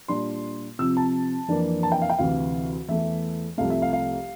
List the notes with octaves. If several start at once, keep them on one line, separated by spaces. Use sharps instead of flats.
A#2 G3 D4 C6
C3 F3 C4 E6
A5
F2 E3 A#3 D4
A5
G5
F5
G5
D2 C3 E3 F5
E2 E3 A3 E5
C2 C3 F3 A3 F5
E5
F5
F5